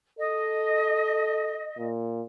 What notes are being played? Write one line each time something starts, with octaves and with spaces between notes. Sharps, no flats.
A4 D#5
A#2